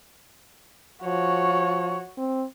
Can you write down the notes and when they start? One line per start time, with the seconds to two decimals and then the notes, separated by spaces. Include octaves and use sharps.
1.04 F3 F#4 C#5
2.17 C4